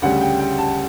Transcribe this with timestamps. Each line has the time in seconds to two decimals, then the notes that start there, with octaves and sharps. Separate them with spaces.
0.02 D2 C#3 G3 F#5
0.21 G5
0.40 G5
0.58 A5